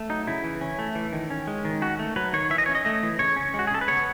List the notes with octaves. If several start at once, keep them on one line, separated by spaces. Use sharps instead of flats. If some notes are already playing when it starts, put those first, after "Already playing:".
Already playing: A3
F#3 D#4
C#3 E4
E3
C#4
A3
E3
D#3
C#4
G#3
D#3
C#4 F#4
A3
F#3 B4
D#3 C#5
E3 E5
D#5
C#4 C#5
D#5
A3 D#5
E3
C#3 C#5
C#4
G#3 F#4
G#4
C#3 A4
B4
B3 C#5